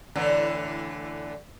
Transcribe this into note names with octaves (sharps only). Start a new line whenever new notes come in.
A2 D3 E3